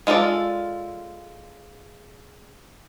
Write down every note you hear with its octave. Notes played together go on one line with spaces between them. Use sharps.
G#3 F4 A4 A#4 D5